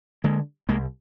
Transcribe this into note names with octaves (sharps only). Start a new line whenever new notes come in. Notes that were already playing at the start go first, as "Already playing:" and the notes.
D3 G#3 A#3
C2 G#3 A#3